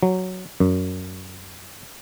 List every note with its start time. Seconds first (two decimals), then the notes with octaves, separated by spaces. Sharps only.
0.03 F#3
0.60 F#2